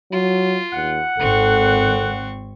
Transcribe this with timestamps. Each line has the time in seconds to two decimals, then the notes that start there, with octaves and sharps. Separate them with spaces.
0.12 F#3 F4
0.73 D#2 F#5
1.19 G#1 C4 A4 C#6